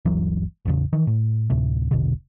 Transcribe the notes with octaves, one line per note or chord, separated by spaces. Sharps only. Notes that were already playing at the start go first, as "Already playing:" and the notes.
G1 D2 E3 F#3
A1 E2 C#3
D#3 E3
A2
D2 A2 C3
E1 A#1 B2 D3